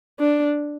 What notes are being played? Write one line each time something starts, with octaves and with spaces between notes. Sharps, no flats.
D4